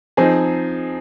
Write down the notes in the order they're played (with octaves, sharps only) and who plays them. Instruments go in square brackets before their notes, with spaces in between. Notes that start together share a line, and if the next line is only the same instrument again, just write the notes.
[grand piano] F3 C4 D#4 G#4